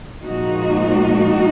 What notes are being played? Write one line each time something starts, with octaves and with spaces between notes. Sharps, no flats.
A#2 F3 G#3 D#4 F#4